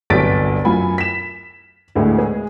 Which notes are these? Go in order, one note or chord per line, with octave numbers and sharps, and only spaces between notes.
G1 C2 F#3 A6 B6 D7
F#2 F4 G#5 B5
B6 E7
D2 A2 G#3
G#3 G#4